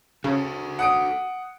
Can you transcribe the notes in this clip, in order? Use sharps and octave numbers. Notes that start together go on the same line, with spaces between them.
C#3 F#4 A4
F#5 D#6 D7